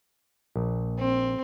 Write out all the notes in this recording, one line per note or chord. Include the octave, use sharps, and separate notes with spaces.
A#1
C4